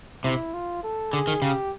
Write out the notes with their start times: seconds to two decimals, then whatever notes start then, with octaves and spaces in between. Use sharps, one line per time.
0.24 C3 E4
0.54 F4
0.83 A4
1.12 D3 G#4
1.27 D#3
1.42 C#3 G4